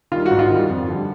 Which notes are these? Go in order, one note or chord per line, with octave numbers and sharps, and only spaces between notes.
D#3 G3 F4
F#4
G#2
F4
D#3 G3
F2
D3 G3